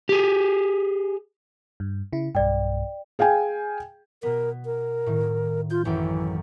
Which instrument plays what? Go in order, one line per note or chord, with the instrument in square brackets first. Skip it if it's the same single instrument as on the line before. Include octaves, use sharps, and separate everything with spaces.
[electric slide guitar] G4 G#4
[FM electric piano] G2
C#3 E4
[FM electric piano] B1 G2 [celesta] D5 G5
[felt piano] G#4 F5 G5 G#5
[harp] B2 B3 [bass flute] A#4
[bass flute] A#4
[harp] A2 D#3
[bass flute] F4 [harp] G6
[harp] A1 F#2 G5 [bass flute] E3